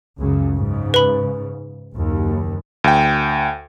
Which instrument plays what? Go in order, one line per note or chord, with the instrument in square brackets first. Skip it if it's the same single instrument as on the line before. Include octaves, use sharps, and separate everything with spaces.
[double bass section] C#2 F#2 C#3
G#2 C#3
[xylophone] B4 B5
[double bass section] F#1 D#2
[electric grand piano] D2 G5